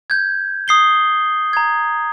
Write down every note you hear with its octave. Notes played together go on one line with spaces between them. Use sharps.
G6 G#6
D#6 C7 G7
A#5 G#6